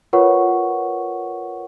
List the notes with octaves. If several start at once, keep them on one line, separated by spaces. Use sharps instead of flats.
F4 A#4 B4 C#5 F#5 C#6